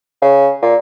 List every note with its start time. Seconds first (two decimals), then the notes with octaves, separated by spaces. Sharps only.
0.22 C#3
0.62 A#2